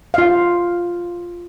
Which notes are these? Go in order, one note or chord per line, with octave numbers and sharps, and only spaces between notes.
F4 F5